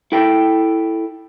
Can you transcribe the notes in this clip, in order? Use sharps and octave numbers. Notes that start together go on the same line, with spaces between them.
E4 A4 G5